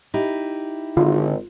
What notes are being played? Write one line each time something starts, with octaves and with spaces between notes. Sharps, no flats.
D#4 E4 G4
G#1 D3 F4